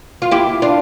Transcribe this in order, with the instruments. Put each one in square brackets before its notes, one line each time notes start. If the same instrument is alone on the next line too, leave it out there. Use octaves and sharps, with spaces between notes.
[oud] F4
E4 G4
D4 F4